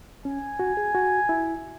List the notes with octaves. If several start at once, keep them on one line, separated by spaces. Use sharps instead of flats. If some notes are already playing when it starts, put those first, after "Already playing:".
C#4 G#5
F#4
G#4
F#4
E4